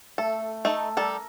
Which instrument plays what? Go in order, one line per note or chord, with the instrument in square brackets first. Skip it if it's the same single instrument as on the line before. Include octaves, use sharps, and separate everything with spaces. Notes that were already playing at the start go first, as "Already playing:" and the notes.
[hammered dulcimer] A3 [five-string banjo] A4
[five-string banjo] A3 D#4 [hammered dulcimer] A4
[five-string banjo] G3 A4 [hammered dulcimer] A#4